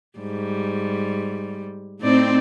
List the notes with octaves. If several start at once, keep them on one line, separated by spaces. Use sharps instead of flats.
G#2 G3
A2 C4 D#4 D5